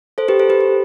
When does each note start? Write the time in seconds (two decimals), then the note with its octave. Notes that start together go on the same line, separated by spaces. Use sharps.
0.18 A4 C5
0.28 G4 B4
0.39 A4 C5
0.50 G4 B4
0.61 G4